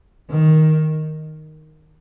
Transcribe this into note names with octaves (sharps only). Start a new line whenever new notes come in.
D#3